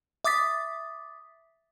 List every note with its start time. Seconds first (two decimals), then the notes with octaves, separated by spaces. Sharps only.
0.24 E5 D6 D#6 A6 B6